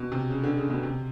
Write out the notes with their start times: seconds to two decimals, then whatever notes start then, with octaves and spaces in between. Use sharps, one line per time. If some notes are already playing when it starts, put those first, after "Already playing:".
Already playing: B2
0.12 C3
0.30 C#3
0.43 D3
0.57 C#3
0.70 B2
0.83 C3